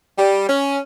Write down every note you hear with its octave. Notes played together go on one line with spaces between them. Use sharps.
G3
C#4